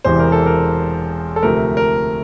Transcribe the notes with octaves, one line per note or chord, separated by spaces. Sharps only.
E1 E2 C3 E3 C5
A#4
A4
A#4
A4
D2 C3 F3 A3 A#4
A#4